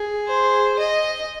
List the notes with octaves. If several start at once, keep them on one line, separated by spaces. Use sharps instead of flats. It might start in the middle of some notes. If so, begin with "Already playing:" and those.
Already playing: G#4
C5
D#5